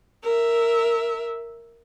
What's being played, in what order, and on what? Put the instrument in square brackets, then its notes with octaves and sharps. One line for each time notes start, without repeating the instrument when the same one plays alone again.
[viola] A#4 E5